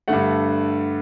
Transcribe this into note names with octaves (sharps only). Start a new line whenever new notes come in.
G2 D3 A3 F#5